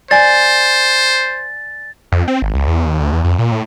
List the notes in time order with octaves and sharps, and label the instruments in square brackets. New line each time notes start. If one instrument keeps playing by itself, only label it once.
[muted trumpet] C5 [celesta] D5 G#5 [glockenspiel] A6
[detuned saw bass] F2
C4
G#1
C#2
E2
D#2
D2
E2
F2
A#2
A2